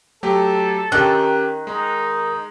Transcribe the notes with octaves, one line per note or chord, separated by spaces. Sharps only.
F#3 A3 G4 A4
D#3 C#4 G4 F#6
G#3 D#4